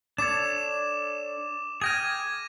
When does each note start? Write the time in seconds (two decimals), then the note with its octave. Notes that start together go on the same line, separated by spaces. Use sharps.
0.18 D4 A4 C#5 D6 E7
1.82 G#4 G5 F6 G#6 A#6 D#7